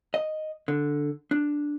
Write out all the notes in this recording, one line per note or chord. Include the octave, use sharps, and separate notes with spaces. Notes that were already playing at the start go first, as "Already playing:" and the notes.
D#5
D3
D4